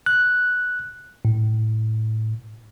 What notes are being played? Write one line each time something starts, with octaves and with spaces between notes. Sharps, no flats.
F#6
A2